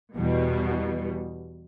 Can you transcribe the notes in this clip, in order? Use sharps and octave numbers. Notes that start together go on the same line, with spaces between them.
E2 B2 G3